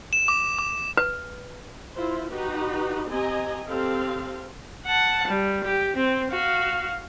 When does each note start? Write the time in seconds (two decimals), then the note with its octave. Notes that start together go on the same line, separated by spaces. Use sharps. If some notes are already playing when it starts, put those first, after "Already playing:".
0.13 E7
0.28 D6
0.59 D6
0.97 B4
1.94 E4 F4 C5
2.29 D#4 F#4 G4 B4
3.08 C4 G4 D#5 G#5 A#5
3.67 C4 G4 A4 F5
4.87 F#5 A5
5.28 G3
5.64 G4
5.96 C4
6.32 F#4 F5